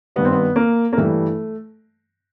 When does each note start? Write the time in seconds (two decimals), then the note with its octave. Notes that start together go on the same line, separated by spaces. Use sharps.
0.16 G2 D#3 G3 B3
0.25 C4
0.33 B3
0.56 A#3
0.93 A#3
0.97 G2 E3 G3 A3